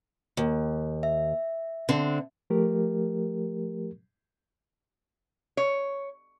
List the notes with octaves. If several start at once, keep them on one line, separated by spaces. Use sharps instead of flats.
D#2
E5
D3 C4
F3 A3 G4 A#4
C#5